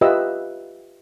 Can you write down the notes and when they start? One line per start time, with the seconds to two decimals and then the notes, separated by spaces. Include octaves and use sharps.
0.01 F4 G4 B4 D#5 E5 E6